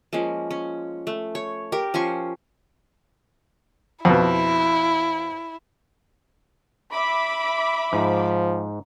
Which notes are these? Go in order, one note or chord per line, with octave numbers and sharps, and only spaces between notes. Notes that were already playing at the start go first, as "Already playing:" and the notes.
F3 G#3 A#3 C#4
C#4
A3
C#5
G4 A#4
F3 C#4 C6 C#6
F2 B2 E4
E5 B5 D6
G#2 F3